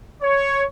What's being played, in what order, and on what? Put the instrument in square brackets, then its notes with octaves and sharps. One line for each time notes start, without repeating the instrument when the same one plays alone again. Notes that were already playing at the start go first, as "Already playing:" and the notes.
[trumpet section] C#5